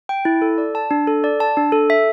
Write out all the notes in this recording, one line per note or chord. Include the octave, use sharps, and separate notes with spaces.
G5
E4
A4
D5
A5
D4
A4
D5
A5
D4
A4
E5